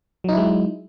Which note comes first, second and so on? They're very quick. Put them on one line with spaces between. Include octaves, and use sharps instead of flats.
F#3 D#4 E4 G#3